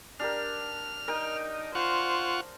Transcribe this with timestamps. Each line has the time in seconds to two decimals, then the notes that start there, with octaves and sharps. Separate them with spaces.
0.19 D4 G4 A#4 F6
1.08 D#4 A#4 G5
1.75 F4 C5 F#5 C#6